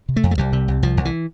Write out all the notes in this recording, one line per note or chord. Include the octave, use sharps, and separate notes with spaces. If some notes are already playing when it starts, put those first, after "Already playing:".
C3
A3
F2
A3
C2 G3
C3
C2
C2 F3
C2
E3